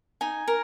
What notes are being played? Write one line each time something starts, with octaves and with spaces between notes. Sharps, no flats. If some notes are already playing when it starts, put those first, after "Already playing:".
D#4 G#5
A#4